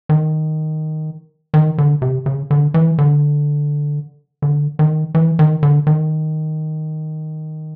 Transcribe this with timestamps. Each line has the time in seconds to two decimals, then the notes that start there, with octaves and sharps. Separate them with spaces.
0.09 D#3
1.54 D#3
1.78 D3
2.02 C3
2.26 C#3
2.51 D3
2.74 E3
2.98 D3
4.42 D3
4.79 D#3
5.15 E3
5.39 D#3
5.63 D3
5.87 D#3